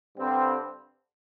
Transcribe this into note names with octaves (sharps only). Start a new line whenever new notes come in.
G2 D3 G3 C4